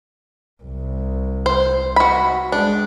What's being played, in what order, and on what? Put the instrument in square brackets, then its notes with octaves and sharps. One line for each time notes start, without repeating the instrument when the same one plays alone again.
[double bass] C2
[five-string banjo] C5
F#4 B5
[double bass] G#3 [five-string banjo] D4